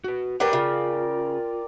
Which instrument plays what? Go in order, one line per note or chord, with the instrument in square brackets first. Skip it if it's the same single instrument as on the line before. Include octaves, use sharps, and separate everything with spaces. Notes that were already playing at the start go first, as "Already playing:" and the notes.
[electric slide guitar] F#4 B4
[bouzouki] D4 G4 B4 [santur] A#4 D5 G5 [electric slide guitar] C#5 F#5
[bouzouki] C#3 [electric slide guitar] F4